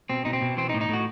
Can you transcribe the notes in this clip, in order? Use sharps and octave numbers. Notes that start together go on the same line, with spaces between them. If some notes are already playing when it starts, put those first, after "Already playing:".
B2 C4
B2 D#4
C4
B2
E3 C4
D#4
A2
D#4
A2 F#4